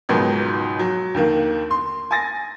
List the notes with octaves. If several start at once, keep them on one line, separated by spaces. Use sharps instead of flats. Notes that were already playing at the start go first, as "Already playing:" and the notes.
C#2 G#2 B2 D#3 F#3
F#3
D#2 D3 D#3 A#3
C6
G#5 A6 A#6